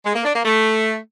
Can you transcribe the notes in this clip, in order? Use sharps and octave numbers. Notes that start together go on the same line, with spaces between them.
G#3
A#3
D4
A#3
A3